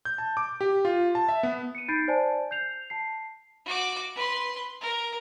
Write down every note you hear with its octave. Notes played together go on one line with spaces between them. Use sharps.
G6
A5
D6
G4
F4
A5
E5
B3
C#7 D#7
D#4 B5 G6 A6 C7 D7
C5 D5 G#5 A5
G6 C7 F7
A5 C7
F#4 D6
B4 C6
A#4